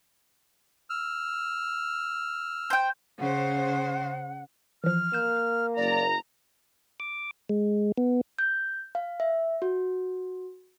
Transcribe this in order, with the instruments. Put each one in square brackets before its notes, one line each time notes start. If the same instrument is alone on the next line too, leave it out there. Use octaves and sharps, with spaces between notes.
[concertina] E6 F6
[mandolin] C5 G5
[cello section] C#3 C5 [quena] F#5
[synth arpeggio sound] E3 F3 [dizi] F6
[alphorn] A#3 [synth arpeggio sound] G6 E7
[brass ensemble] F#1 A#5 [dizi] D5
[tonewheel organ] D6
G#3
B3
[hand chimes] G6
F5
E5
F#4